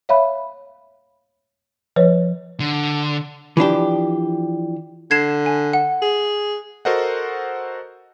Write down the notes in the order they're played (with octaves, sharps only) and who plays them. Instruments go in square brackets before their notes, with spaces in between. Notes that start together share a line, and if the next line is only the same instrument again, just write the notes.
[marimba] C#5 E5 F5 B5
F3 B4 C#5
[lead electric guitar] D3
[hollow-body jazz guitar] E3 F3 D4 G4
[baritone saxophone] D3 [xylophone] G#6 C7 E7
[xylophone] G#5
F#5
[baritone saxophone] G#4
[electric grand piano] F#4 A4 A#4 C5 D#5 F#5